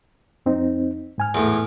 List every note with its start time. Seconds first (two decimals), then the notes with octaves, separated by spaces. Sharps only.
0.46 F2 C4 D#4
1.18 G#2 G#5 F6
1.35 E2 A2